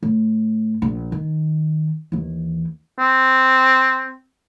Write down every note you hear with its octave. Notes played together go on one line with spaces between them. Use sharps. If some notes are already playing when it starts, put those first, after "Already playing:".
A2
A#1
D#3
D#2 E3
C4